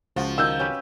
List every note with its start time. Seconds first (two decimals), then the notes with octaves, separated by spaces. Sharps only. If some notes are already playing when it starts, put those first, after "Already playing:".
0.16 C#2 F3 F#4
0.38 D#3 E6 G6
0.59 C#4 G4 B4